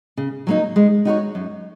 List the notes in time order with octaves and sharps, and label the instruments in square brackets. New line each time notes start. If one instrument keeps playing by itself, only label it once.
[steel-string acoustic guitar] C#3
F#3 A#3 D#4
G#3
D#4 F#4 A#4 C#5
F#2